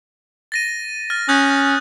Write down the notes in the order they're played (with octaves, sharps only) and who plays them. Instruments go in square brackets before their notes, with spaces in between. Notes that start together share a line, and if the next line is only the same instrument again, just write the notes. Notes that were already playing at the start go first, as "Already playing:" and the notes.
[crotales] A6 A#6 D#7
F6 A6
[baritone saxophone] C#4 [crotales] D#6 F#6 G6